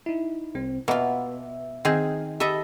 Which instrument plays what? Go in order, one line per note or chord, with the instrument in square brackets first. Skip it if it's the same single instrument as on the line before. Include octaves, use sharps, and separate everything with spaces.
[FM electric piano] D#4 E4
C2 C4
[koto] B2 [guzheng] A#3 F4 [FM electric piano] E5
[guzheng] D#3 [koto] C4 G#4
[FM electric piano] G4 B5 [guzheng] A4 D#5 [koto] E5